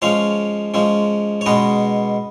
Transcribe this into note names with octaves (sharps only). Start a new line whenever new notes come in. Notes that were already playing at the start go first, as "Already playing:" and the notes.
F3 G#3 C#4 C#5 F5
F3 G#3 C#4
C#5
B2 G#3 C#4 B4 D#5